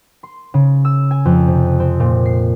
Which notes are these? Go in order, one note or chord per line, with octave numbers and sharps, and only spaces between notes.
C6
C#3
E6
G#5
F2
C3
D#6
C4
A#2
C7